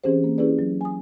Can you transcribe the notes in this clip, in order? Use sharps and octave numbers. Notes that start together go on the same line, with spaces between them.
E3 C4 C#4 G4 G#4 C5
A#3
C#4 E4 G4 G#4 B4 D5
F#3
G#5 D#6